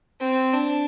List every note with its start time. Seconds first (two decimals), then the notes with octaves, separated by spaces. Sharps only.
0.21 C4
0.53 D4